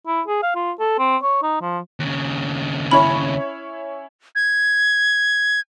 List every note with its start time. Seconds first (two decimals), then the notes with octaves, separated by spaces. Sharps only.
0.07 E4
0.27 G#4
0.43 F5
0.55 F4
0.79 A4
0.98 C4
1.23 C#5
1.43 D#4
1.61 F3
2.00 D#2 C#3
2.91 C#4 E4 C#5 B5
4.36 G#6